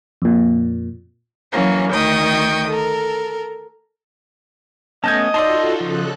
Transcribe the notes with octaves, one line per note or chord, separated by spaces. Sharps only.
F2 A#2
E3 F#3 A#3 C#4
D2 D#3 G5 C#6 D#6
A4 A#4
A3 B3 C#4 D#5 A5 G6 G#6
D#4 F4 F#4 A4 D5 A5 C6 E6
C#3 F3 A4 F#6